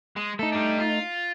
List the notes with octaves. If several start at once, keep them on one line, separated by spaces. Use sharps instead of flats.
G#3
A3 D#4 A4
G3 D4
F4